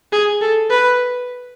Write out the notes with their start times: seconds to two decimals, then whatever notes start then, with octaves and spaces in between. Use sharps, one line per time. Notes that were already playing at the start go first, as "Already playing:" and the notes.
0.12 G#4
0.41 A4
0.70 B4